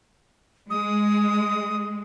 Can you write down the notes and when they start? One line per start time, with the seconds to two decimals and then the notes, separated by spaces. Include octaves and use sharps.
0.70 G#3 D#6